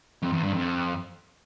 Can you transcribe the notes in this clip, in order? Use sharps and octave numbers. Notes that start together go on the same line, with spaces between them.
F2
E2
G2
F2